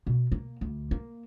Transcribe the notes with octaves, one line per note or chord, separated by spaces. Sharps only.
B2
A#3
D2
A#3